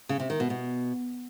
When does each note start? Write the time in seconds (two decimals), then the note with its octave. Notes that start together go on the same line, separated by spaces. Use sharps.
0.09 C#3
0.20 C3
0.30 D#3
0.40 B2
0.50 B2